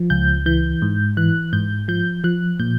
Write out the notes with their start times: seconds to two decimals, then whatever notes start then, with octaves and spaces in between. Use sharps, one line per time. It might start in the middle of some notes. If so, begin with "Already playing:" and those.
Already playing: F3
0.10 C#2 G6
0.46 E3 G6
0.82 G#2
1.17 E3 F#6
1.53 G#2 G6
1.88 F3 G6
2.24 F3 F#6
2.59 A#2 G6